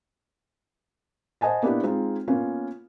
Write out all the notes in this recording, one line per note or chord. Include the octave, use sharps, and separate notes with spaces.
C5 D#5 F#5 G#5 A5
A#3 B3 D4 E4 G4
G#3 C4 D#4 F4
A#3 B3 C#4 F4